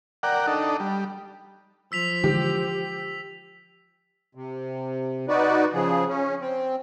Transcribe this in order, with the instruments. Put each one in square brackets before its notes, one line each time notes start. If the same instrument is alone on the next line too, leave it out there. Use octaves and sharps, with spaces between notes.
[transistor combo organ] A#4 D5 F#5 G5
D4 D#4 A4
G3
[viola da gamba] F3 [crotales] E6 B6 F7
[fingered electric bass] D3 E3 G#3 [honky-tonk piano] G4
[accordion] C3
D#4 F#4 B4 D5
C#3 F3 G#4
C#4
C4